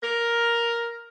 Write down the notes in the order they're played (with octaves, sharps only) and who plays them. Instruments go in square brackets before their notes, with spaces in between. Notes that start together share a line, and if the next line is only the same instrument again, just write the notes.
[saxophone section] A#4